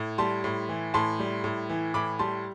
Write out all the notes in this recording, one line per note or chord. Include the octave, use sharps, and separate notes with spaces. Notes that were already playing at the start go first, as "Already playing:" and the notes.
Already playing: A2
G3 A5 C6
A2
E3
A2 A5 C6
G3
A2
E3
A2 B5 D6
G3 A5 C6